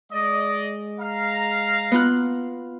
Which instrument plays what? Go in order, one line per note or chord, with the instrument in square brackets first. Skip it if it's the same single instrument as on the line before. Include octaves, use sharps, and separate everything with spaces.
[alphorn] G#3 [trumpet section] D5 D#5
[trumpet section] F5 A#5
[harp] B3 F4 F#6